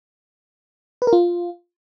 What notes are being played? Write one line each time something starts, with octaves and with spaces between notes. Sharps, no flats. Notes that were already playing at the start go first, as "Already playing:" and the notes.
B4
A#4
F4